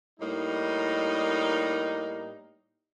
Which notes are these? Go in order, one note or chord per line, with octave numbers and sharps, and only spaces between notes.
A2 G3 A#3 D#4